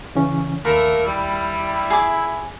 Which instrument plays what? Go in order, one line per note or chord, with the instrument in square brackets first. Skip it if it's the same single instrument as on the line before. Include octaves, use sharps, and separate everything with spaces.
[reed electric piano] C#3 E3 C#4
[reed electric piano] D#2 [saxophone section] A3 A#3 A#4 [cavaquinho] E5 B5
[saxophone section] G3 [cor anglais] E4
[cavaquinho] G#4 D6